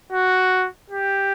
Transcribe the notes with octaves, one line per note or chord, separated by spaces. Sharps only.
F#4
G4